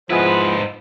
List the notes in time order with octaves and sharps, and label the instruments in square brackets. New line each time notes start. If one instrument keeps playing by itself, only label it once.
[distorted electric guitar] G#2 B4 [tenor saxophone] F3 [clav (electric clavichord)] G#3 B3 E4 [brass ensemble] C5